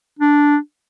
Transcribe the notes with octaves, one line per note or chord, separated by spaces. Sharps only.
D4